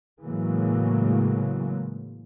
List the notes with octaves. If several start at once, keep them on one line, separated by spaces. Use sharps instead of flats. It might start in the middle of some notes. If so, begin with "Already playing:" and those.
A2 C#3 E3 F#3 G#3 A#3